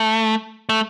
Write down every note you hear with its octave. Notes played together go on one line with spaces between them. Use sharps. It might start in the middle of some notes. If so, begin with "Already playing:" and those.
Already playing: A3
A3